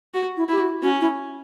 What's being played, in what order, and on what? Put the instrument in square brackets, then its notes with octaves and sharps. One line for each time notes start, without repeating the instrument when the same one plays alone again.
[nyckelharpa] F#4
[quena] E4
[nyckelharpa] E4 [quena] G4
[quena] F#4
[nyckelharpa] C#4 [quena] F#4
[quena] E4